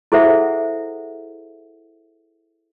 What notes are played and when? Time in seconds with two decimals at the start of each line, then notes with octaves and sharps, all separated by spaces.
0.12 E4 G#4 A4 C5 E5 F#5